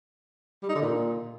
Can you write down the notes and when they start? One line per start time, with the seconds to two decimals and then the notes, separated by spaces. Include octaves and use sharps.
0.63 G3
0.69 D#4
0.75 D3
0.81 A#2